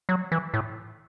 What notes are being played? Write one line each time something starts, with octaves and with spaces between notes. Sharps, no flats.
F#3
E3
A2